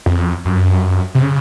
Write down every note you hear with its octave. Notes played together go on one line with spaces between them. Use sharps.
F2
F#2
C3
C#3